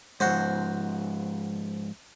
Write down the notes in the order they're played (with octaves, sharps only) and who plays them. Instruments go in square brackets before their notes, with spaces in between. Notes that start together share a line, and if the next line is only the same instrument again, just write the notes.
[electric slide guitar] G#2 F3 [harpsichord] F#4 C5